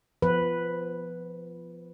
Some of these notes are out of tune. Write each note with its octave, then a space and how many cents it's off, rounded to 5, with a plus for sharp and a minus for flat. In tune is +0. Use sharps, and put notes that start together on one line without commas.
F3 -20 B3 +5 B4 +0